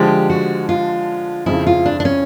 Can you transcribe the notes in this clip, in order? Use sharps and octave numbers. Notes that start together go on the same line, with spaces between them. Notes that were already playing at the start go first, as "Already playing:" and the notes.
Already playing: D3 F3 G#3 G4
F#4
F4
F2 C#3 F3 E4
F4
D4
D4
C#4